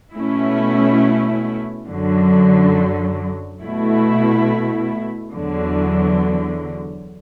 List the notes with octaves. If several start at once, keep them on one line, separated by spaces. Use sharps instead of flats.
B2 A3 C#4 E4
F#2 D3 F#3
B2 A3 E4
E2 D3 F#3